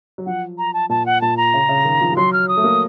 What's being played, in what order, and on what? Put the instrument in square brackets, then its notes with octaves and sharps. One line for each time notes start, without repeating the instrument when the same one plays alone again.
[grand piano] F#3
[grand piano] F3 [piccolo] F#5
[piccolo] A#5
A5
[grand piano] A#2 [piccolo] A5
[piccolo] F#5
[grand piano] A#2 [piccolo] A5
[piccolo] A#5
[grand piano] C#3
C#3
D#3
F3
F3
[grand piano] F#3 [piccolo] C6
[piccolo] F6
D#6
[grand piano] A3
A#3